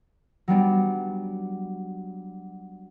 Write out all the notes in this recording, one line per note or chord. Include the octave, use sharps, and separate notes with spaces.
F#3 G3 B3 D4